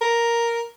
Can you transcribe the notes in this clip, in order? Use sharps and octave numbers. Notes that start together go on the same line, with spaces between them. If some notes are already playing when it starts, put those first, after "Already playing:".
A#4